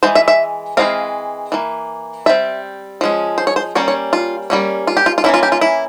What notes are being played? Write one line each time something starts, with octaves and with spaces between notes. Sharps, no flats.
E3 G#3 C5
E5
E5
E3 G#3 C4 F5
E3 A#3
G3 C4 E5
F3 G#3 C#4
C5
C#5
C5
G3 A#3 C#4 C#5
C#5
F4
G3 A#3 C#4
F4
G4
F4
F4
E3 A#3 C#4 E4
F4
G4
F4
E4